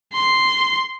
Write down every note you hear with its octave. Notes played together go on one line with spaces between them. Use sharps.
C6